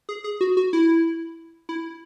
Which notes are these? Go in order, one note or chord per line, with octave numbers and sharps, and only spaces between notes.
G#4
G#4
F#4
F#4
E4
E4